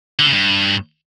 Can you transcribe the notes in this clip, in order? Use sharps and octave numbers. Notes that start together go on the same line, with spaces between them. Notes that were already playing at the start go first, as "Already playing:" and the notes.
D3
C#3
G2